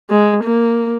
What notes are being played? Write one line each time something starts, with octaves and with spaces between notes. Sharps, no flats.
G#3
A#3